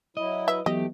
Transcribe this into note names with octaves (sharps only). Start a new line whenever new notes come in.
F#3 E4 D#5
B4 E5
E3 F#3 A3 B3 G4 D#5